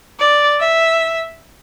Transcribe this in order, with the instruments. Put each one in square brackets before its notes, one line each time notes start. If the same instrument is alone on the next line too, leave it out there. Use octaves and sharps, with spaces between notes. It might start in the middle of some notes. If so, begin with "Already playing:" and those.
[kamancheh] D5
E5